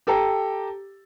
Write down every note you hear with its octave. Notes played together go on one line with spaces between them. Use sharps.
G4 A4 G5 A#5